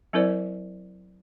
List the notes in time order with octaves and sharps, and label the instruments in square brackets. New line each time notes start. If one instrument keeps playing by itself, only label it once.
[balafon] F#3 C4 E4 A#4 C5 D5